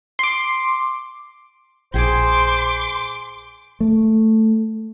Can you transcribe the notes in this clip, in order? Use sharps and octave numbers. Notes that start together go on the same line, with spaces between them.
C6 D6
A#1 G#4 C5 G5 C6 D6
A3